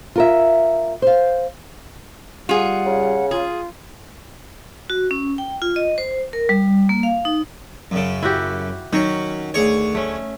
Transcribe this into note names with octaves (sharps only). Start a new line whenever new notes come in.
F4 A#4 E5
C5 F5
G3 F4 G#4 F#5
C#3
F4 G#4
F#4
C#4
G5
F4
D#5
C5
A#4
G3
A#3
F5
D#4
F#2 C#3
E4 F#4 G4
D#3 F#3 C#4
D2 G#4 C#5
A3 C#4